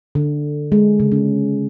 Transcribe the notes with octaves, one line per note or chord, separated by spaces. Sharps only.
D3
G#3
C#3
C#4